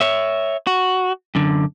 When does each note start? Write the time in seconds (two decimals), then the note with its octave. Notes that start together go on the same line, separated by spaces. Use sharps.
0.01 C#5 E5
0.67 F#4
1.35 F#2 D3